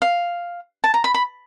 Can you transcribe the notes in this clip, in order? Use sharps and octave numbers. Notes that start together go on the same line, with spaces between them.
F5
A5
A#5
B5
B5